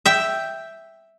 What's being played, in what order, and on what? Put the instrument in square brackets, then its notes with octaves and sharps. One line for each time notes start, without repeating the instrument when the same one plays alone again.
[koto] E5 G5